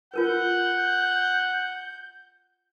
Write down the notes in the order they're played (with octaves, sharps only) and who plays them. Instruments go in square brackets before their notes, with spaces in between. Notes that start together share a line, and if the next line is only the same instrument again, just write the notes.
[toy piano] F4 A#4 B4 [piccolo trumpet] F#5 [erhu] G6